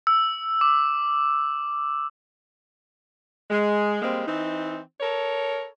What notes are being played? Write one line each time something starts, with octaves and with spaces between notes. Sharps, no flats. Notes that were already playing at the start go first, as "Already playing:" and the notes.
E6
D6
G#3
G3 G#3 A#3 C4
E3 C4 D#4
A4 A#4 C#5